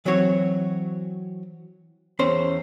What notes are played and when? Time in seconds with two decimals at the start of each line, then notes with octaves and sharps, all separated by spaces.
0.05 E3 F#3 C4 F#4 C#5
2.19 E2 C#4 C5 C6